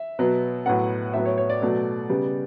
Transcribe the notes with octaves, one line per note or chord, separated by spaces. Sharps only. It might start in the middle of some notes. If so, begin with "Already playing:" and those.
Already playing: E5
B2 F#3 B3
A2 F#3 B3 F#5
A2 F#3 B3 E5
C#5
C#5
D5
B2 F#3 A3
C#3 G3 B3